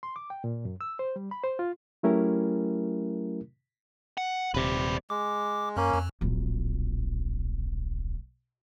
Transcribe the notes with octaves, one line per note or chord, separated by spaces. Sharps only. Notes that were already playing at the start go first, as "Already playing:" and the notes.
C6
D6
G5
A#2
F#2
E6
C5
G3
B5
C5
F4
F#3 A3 C#4 E4 G4 A#4
F#5
D#1 C3 B4 D5
G#3 D6
F#2 A#3 C#4
F2
D1 A#1